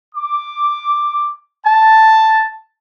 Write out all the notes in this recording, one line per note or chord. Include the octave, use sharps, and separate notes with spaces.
D6
A5